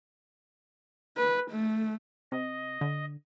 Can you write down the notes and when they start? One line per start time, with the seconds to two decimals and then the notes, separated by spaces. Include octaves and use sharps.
1.17 B4
1.51 A3
2.32 C3 D#5
2.81 D3